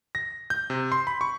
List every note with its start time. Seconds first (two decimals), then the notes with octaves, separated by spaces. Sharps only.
0.15 A#6
0.50 G6
0.70 C3
0.92 C6
1.07 B5
1.21 C#6